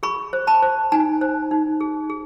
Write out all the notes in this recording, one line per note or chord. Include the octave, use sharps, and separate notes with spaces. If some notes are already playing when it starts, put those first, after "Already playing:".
G#4 B5 C#6
C5
A5 B5
C5
D#4 G#5 A#5
C5
D#4
G#4
G#4